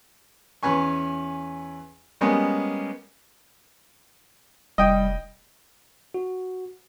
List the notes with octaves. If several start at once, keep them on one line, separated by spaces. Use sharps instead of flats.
E2 C#4 B4 G#5 C#6
G3 G#3 A#3 B3 C#4
F1 G3 D#5 G5
F#4